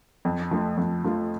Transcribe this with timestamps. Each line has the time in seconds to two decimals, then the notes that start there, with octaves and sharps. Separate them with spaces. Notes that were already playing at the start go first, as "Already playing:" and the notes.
0.25 F2
0.51 F3 A3 F4
0.77 F2
1.04 F3 A3 F4